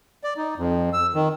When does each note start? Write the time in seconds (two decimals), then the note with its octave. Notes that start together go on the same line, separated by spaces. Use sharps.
0.24 D5
0.37 D#4
0.57 F2
0.93 E6
1.14 D#3